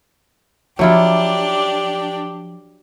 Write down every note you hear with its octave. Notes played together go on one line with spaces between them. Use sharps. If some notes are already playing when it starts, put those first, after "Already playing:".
F3 F#3 D4 E4 F4 G4